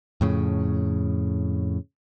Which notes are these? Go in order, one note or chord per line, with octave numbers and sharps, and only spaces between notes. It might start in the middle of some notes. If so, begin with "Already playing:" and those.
F2 A2 C#3